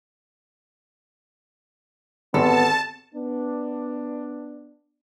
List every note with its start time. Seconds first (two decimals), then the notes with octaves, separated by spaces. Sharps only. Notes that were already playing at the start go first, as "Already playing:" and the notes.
2.34 G#1 B3 G4 A4 A5 C6
3.13 B3 D4